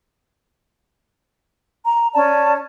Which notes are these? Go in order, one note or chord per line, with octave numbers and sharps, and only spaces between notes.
A#5
C#4 D5 A5